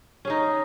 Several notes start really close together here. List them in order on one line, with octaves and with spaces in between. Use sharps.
C#4 G#4 D#4